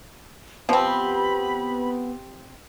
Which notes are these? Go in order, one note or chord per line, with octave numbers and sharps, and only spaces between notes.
F3 B3 C4 G4 B5